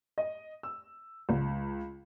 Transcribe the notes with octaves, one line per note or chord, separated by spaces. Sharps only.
D#5
E6
C#2